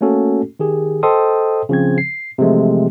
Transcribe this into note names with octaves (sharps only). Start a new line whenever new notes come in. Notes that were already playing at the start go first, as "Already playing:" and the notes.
A3 A#3 C#4 F#4 A4
D#3 G4 G#4
A4 C5 D#5 G5 C6 D#6
C#3 F3 C4 G#6
C7
C3 E3 F3 G#3 A3